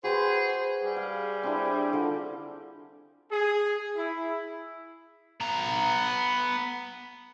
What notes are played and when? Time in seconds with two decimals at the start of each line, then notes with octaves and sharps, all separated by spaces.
0.04 F#4 G#4 B4 C5 G5
0.82 G3 G4 G#4
0.97 F5
1.43 C4 D4 E4
1.93 D3 F4
3.31 G#4
3.96 E4
5.41 B3 A#5